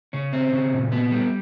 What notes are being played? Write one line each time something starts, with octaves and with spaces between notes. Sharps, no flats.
C#3 C#4
C4
C#3
A#2
B3
G3